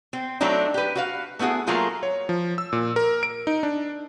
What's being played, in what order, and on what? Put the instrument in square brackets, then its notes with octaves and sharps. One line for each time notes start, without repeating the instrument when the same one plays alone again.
[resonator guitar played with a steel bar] C4
F#3 A3 C4 D4 D#4
G4 B4
F#4 B4 F5
A3 B3 E4 F#4 G#4
F#3 A3 A#3 F4 G#4 C5
[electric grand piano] C#5
F3
E6
A#2
A#4
D7
D#4
D4